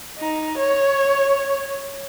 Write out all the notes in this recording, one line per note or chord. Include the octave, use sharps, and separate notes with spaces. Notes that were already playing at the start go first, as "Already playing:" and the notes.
D#4
C#5